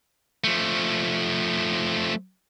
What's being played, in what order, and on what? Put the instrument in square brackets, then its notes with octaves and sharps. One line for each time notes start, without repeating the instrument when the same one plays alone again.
[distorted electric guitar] F3 A3